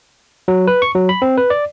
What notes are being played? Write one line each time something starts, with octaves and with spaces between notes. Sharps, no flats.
F#3
B4
C#6
F#3
B5
C4
B4
D5